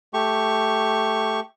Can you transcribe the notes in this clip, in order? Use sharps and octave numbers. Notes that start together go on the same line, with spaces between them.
A3 G4 C#6